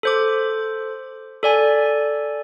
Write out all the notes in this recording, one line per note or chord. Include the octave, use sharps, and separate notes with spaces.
A4 C5 D6
A4 D5 G#5